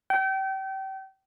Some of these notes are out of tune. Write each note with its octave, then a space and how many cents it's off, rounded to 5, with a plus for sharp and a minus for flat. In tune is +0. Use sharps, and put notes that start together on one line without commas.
G5 -30